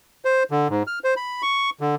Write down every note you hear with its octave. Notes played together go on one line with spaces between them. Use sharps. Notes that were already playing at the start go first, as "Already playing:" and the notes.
C5
D3
G#2
F6
C5
B5
C#6
D3